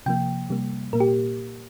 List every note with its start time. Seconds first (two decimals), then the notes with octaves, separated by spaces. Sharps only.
0.06 C3 F3 A#3 G5
0.50 C3 G3 A#3
0.93 A#2 A#3 A#4
1.00 G4